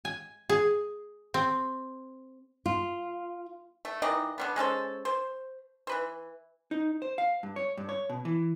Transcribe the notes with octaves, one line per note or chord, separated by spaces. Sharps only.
G#5
G#4
C4
F4
A3
D#3 E3 D5 D#5
D3 G3 B3
G#3 C#4 A4 C5
C5
E3 B4 C5
D#4
C5
F5
G2
C#5
G2
C#5
B2
E3